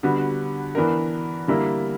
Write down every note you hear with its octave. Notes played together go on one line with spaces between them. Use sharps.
D3 G3 B3 F#4
E3 B3 D4 A#4
D3 G3 A#3 E4